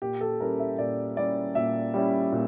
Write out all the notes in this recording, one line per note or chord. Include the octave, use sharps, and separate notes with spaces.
A#2 G4
A4
G3 C#4 E4 A#4
E5
A#2 D5
G3 C#4 E4 D5
A#2 E5
G3 C#4 E4
A#2